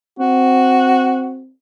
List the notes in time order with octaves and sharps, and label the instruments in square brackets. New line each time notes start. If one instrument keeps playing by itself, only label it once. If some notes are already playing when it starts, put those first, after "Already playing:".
[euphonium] C4 [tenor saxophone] F#4